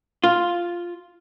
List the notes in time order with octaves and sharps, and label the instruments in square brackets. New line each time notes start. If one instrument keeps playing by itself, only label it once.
[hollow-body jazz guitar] F4